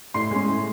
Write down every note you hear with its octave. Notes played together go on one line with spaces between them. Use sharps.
A2 C6 C7
G#3 C#4
A2